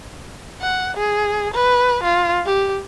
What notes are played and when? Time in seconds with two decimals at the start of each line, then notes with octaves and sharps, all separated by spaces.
0.61 F#5
0.97 G#4
1.54 B4
2.03 F4
2.46 G4